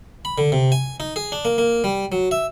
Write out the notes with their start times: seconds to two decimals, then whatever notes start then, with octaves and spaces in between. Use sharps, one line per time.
0.25 B5
0.38 D3
0.52 C3
0.72 G#5
1.00 D#4
1.16 G#4
1.32 D4
1.45 A#3
1.58 A#3
1.84 G3
2.12 F#3
2.31 E5